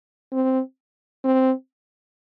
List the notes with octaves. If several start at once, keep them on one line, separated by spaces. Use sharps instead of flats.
C4
C4